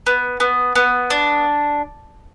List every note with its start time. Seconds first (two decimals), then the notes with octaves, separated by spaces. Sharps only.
0.07 B3
0.40 B3
0.76 B3
1.10 D4